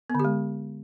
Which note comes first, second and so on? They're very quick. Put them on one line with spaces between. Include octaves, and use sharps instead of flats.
B3 D3 G4 G#3